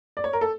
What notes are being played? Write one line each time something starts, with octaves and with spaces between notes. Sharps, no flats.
D5
C#5
A#4
A4